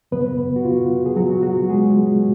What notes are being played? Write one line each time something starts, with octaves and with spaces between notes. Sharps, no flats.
F#2 C#3 F#3 B3 B4
F#4
F4
G#4
F#3 F#4
F#3 F#4
G#3 G#4